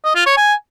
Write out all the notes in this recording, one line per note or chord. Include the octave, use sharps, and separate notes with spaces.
D#5
F4
C#5
G#5